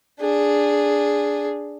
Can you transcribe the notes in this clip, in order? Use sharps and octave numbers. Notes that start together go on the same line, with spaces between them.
D4 G#4